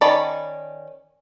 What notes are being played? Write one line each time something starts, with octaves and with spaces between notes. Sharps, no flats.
D#3 C#4 D5 A5 B5